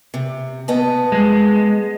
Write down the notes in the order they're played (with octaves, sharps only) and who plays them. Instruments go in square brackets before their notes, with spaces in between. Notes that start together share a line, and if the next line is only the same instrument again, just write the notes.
[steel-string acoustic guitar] C3
B3 D#5 A5
[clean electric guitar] G#3